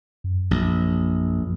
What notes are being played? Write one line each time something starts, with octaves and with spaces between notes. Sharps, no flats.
F#2
A#1